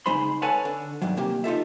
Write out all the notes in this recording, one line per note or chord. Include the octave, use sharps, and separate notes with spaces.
C#3 G#3 D#4 C5 B5 C6
A4 B4 C#5 F#5 G#5 A5
D3
B1 G2 D#3 F#3
C3 A#3 G4
D#4 F4 A4 E5